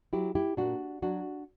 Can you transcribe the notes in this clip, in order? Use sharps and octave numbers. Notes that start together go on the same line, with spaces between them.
F#3 E4 G4
E4 G4
A#2 D4 F#4
F#3 D4 F#4